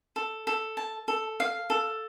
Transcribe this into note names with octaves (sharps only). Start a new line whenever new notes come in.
A4
A4
A5
A4
F5
A4